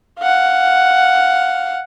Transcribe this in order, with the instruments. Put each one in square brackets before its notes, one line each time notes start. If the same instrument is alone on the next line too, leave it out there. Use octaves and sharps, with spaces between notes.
[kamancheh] F5 F#5